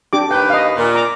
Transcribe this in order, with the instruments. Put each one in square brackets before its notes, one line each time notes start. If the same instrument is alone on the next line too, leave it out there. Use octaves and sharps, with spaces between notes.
[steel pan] D4 G4 D6
[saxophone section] D#2 B4 [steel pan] G5
[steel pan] D#5 F5
[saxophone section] A#2
[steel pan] A#5 D6